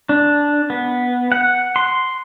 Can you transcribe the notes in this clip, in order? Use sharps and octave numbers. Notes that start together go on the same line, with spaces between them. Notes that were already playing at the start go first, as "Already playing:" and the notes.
D4
B3
F#5
C6